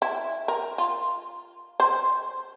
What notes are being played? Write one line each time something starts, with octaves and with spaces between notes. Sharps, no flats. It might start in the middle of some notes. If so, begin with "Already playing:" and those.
E4
A#4
F4
C5